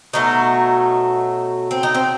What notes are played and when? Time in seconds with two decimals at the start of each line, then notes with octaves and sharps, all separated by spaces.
0.13 B2 F#3 A3 D#4
1.71 C4
1.83 D#4
1.95 C4